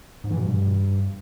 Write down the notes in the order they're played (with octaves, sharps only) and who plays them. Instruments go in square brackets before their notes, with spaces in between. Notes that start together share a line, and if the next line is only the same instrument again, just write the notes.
[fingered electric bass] G#2
E3
B2
G2